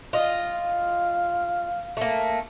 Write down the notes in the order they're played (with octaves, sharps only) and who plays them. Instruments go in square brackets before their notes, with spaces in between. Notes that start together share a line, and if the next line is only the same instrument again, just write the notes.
[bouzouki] F4 D#5
[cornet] F5
[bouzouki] A3 A#3